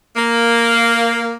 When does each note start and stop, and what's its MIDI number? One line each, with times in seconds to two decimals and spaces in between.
0.16 1.35 58